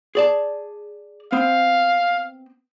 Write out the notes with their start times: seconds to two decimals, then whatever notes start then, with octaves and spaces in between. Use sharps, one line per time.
0.15 G#4 D5 A5
1.32 B3 C4 F5